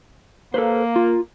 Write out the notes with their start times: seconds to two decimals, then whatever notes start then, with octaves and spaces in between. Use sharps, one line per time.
0.54 A#3 A4 B4 C5
0.96 F4